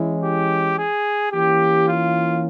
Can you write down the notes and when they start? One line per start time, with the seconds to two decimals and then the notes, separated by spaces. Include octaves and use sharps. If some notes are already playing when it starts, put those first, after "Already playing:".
Already playing: E3 G#3 C#4 E4
0.22 G4
0.77 G#4
1.32 E3 A#3 C#4 G4
1.87 F4